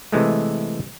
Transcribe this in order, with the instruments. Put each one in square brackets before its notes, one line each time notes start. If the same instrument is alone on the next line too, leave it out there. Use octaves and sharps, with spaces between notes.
[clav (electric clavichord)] C3 E3 G#3 A3